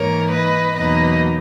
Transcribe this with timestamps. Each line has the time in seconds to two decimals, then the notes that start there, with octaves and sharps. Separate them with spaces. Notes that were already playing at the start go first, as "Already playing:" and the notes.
Already playing: G#2 E3 A#3 D#4 A#4 C#5
0.32 B4 D#5
0.77 E2 B2 F#3 A#3 D#4 B4 D#5